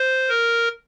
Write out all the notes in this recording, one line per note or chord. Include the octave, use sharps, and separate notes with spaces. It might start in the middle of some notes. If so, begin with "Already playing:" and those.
Already playing: C5
A#4